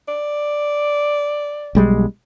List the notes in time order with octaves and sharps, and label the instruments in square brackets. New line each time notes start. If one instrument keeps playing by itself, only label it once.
[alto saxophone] D5
[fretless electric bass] B1 G3 G#3